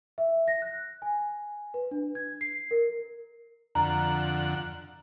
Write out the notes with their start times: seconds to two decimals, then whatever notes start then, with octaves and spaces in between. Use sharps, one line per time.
0.18 E5
0.48 A#6
0.62 F#6
1.02 G#5
1.74 B4
1.91 D4
2.15 G#6
2.41 C7
2.71 A#4
3.75 F2 D3 F#5 A#5